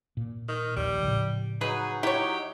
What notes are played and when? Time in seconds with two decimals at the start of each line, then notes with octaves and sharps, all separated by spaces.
0.17 A#2
0.48 D#3
0.76 A#1 D#2 G3
1.02 A2 C#3 F3
1.61 F#3 D#4 G#4 B4
2.03 E4 G4 C#5